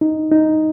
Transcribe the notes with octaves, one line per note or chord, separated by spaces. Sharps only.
D#4
D#4